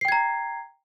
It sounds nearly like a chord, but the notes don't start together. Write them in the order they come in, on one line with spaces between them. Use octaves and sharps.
C7 G5 G#6 A#5